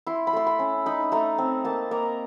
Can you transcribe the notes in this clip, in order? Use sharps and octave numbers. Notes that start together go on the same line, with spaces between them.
E4 C6
B5
A3 C6
B5
C#4
D#4 B5
A3 A#5
C4
A#3 A5
A#3 A#5